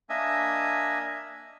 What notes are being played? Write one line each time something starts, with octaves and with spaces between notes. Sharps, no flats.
A#3 D4 D#5 E5 G#5